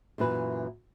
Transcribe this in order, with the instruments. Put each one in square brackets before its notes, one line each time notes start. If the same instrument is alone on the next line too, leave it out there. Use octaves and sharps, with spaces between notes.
[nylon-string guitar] F#2 A#2 E3 B4